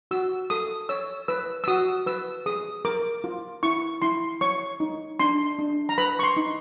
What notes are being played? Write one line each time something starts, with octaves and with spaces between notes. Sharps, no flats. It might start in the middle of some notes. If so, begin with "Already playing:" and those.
F#4 E6
A4 D#6
C#5 E6
B4 E6
E6
F#4 D#6
B4 E6
G#4 D#6
A#4 D6
F4
E4 C#6
E4 C6
C#5 C#6
D#4
D4 C6
D4
A#5
B4 B5
C#6
C6
D#4